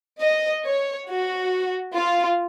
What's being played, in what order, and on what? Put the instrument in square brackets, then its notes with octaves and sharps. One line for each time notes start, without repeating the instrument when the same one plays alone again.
[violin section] D#5
C#5
F#4
F4